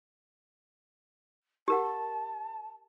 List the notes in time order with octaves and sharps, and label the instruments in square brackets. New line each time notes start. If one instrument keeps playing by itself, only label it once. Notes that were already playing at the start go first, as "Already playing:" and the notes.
[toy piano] G4 A#4 F#5 [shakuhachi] A5